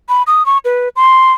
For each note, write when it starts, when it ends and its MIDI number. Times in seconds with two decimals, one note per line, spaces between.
0.09 0.23 83
0.27 0.45 87
0.46 0.58 85
0.65 0.89 71
0.96 1.32 84